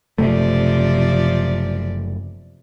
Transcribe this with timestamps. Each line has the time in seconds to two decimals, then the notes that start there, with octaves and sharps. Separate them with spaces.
0.18 F#1 C3 F3 A3 D5